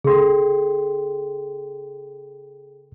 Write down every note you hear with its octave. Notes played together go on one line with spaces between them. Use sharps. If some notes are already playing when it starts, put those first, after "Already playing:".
C#3 G#4 A4 G5 C6